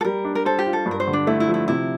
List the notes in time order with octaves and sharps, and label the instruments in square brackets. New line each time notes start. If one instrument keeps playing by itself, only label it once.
[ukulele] A4
[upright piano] G3 [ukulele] A#4
[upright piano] D4
[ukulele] A#4
[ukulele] A4 [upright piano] C5
[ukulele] G4
[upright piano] F4
[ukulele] A4
[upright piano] G2
[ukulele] A#4
C5
[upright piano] D3
[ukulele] D4
[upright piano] A3 [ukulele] E4
[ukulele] E4
[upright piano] F3
[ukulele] E4
[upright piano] C3 [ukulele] E4